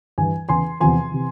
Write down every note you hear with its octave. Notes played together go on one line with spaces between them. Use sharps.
G2 E3 G#5
E2 C#3 E3 G#5 C6
E2 C3 F3 G#5 C6
C3 E3